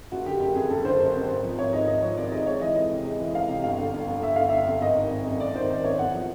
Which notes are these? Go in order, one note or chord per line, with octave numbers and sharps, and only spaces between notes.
F#1 F#4
D3 G4
F#1 G4
F2 G#4
F#1 A4
D3 C5
F#1
F2
G#1
F3
G#1 C#5
G#2 D#5
G#1 D#5
F3 C#5
G#1 D5
G#2 D#5
G#3 C#5
E3 D#5
F2 D#5
C3
G#3
E3
F2 F5
C3
G1 F5
D3
G1
F2
G1 E5
D3 F5
G1 E5
F2
G#1 D#5
D#3
G#1
F#2
G#1 D5
D#3 C5
G#1 C5
F#2 C#5
E2 F#5
F3